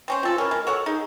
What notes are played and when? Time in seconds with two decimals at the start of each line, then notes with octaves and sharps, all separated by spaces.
0.08 C4 C#4 C5
0.23 C4 F4 A4
0.38 C#4 E4 A#4
0.51 G#3
0.67 F#4 A4 C#5 F#5
0.86 D#4 G#4